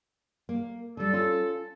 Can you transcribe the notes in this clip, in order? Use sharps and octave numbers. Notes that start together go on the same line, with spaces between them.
A#3
D3 G3 A4
C#4 F4